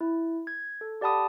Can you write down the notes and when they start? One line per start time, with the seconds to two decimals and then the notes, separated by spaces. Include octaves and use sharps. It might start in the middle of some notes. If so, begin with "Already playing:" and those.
0.01 E4
0.47 G#6
0.81 A4
1.01 G4 D5 F#5 A5 B5 D#6